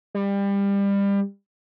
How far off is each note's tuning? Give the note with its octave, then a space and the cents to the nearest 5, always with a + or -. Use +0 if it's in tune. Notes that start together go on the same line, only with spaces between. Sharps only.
G3 +25